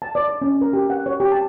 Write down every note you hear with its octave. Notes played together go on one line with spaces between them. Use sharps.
A5
D5
D5
C#4
A#4
G4
F#5
C#5
G4
A5